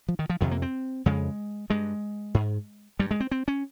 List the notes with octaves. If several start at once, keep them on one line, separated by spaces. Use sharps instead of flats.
F3
D#3
F3
F2 C3 D#3
A#3
C4
F2 C#3 G#3
G2 G#3
G#2
G2 G3
G#3
C4
C4
C#4